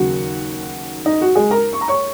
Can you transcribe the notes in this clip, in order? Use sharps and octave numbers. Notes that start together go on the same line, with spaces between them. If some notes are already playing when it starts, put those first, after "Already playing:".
Already playing: D#2 C#3 F#3 F#4
D#4
F#4
G#3 G#4
A#4 A#5
C#6
A#5
C#5 C#6